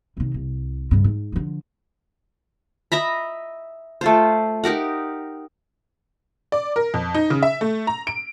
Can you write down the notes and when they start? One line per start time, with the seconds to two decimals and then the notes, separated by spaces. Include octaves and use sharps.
0.17 C3 D#3
0.34 C2
0.91 G2 C#3
1.04 G#2
1.32 D3 F3
2.92 D#5 E5 A#5 B5
4.01 A3 F4 C5
4.64 D#4 G4 A#4 F#5
6.52 D5
6.76 A#4
6.94 F2
7.14 D#4
7.30 C#3
7.43 E5
7.61 A3
7.87 A#5
8.07 D7